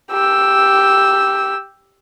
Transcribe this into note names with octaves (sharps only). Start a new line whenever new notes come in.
G4 E6